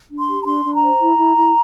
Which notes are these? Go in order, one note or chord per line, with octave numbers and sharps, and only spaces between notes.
D4
C6
G4
A#5
D4 C6
D4
A#5
C5
E4
E4
E4